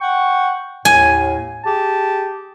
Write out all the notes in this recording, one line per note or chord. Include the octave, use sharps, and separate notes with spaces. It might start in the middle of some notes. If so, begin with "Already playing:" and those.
F#5 G5 C#6
D#2 A2 G#5
G4 G#4 A5